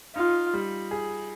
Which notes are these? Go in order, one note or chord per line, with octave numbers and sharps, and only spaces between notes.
D#4 F4
G3
G#4